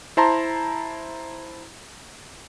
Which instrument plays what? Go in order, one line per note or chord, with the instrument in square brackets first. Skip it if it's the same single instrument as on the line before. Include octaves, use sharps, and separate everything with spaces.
[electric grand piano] E4 C5 A5 A#5 C6